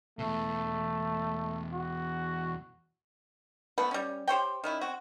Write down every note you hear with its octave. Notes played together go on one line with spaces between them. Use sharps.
E2 B2 A3
F#4
F3 A3 B3 B4
G3 C#4
G4 C5 C#5 G5
D#3 C#4 E4
C4 F#4